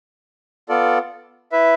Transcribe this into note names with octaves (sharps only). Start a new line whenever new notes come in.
B3 F4 A4 D5
E4 B4 E5